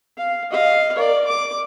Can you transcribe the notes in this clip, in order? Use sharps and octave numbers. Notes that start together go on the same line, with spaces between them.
F5
D#5 F5
A#4 D5
D6